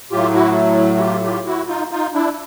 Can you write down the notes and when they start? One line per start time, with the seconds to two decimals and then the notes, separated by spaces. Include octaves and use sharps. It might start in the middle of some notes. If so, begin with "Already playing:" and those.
0.11 A2 F#3 A3 F4 G4
0.33 E4 F#4
0.97 F#4
1.01 F4 G4
1.23 F4 G4
1.46 E4 F#4
1.68 D#4 F4
1.91 D#4 F4
2.14 D4 E4